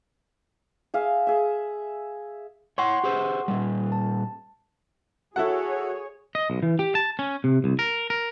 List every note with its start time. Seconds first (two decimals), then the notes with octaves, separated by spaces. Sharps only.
0.94 G#4 E5 F5
1.27 G#4 E5
2.78 C#5 F#5 G5 C6 C#6
3.04 G4 G#4 C5
3.48 A#2 G3
3.92 A5
5.36 E4 F#4 G#4 A4 C#5 F#5
6.35 D#5
6.50 B1
6.63 E3
6.79 G4
6.95 A5
7.19 C#4
7.44 C3
7.64 C2
7.79 A#4
8.10 A#4